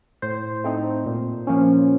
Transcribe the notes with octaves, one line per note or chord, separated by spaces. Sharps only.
A2 C5
A3 C4 D#4
A#2
F3 A#3 C#4